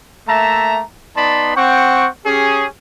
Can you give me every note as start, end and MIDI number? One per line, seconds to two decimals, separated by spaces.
0.28 0.82 57
0.28 0.82 58
0.28 0.82 76
0.28 0.82 81
0.28 0.82 82
1.16 1.53 59
1.16 1.53 63
1.16 1.53 74
1.16 1.53 81
1.16 1.53 83
1.16 1.53 84
1.56 2.08 60
1.56 2.08 78
1.56 2.08 79
1.56 2.08 85
2.25 2.66 61
2.25 2.66 67
2.25 2.66 68